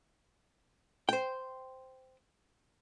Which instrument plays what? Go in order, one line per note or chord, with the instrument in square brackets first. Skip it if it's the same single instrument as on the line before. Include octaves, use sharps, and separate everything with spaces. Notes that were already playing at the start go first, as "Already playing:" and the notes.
[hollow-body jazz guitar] C5 G5